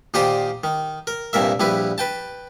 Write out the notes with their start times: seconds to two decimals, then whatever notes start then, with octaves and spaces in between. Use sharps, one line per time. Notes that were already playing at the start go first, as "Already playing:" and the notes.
0.14 A#2 D#3 G4 C5 D5 D#6
0.64 D#3
1.07 A#4
1.33 C2 G2 A#2 A#4 E5
1.60 A#1 G3 E4 B4
1.98 B4 G5 A5